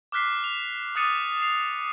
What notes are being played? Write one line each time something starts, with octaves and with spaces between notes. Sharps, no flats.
D6 F6 F#6 B6 C7
F7
D6 D#6 F#6 A6 C#7 D#7
C7 F7